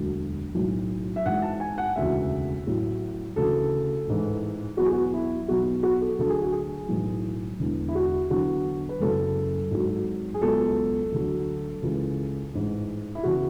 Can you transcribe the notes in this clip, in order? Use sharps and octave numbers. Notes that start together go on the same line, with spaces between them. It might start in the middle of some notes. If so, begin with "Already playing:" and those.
Already playing: E1 D2 D3 F#3
B1 A2 F#3
E5
G#1 G#2 E3 F#5
A5
G#5
F#5
E1 D2 C#3 E3 E5
A1 A2 F#3
D2 C#3 E3 A4
A1 G#2 E3
E2 B2 F#3 F#4
G#4
F#4
E4
B1 B2 F#3 F#4
F#4
A4
D2 D3 F#3 A4
G#4
F#4
G#4
B1 A2 E3
E1 E2 D3
E4
F#4
E2 D3 F#3 F#4
B4
F#1 F#2 C#3 F#3 A4
G#1 G#2 F#3
G#4
C#2 B2 F#3 A4
D2 D3 F#3
C#2 C#3 E3
A1 G#2 E3
E4
E2 C#3 E3 F#4